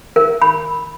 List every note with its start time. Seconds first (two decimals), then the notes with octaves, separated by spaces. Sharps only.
0.16 A#4
0.42 B5